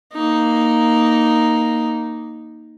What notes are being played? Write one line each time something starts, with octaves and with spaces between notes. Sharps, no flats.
A#3 D#4